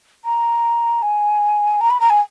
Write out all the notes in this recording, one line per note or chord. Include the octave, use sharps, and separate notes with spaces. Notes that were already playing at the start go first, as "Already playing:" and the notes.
A#5
G#5
A#5
B5
A#5
G#5